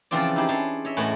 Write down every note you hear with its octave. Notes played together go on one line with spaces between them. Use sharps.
C#3 E3 F3 C4 F4 D5
D#4 E4 G4 G#4 C5
C#4 D4 G#4 C5 A5
C#5 D#5 E5
E2 A2 E3 G#3 F#4 A5